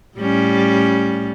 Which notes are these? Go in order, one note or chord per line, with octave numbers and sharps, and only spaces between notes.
A2 G3 C#4